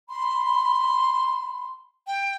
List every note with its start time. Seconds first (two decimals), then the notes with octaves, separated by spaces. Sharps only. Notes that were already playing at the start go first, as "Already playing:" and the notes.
0.10 B5 C6
2.07 G5